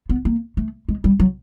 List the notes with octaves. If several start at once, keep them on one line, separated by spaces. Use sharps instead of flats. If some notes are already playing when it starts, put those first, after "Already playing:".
B3
A#3
A3
G#3
G3
F#3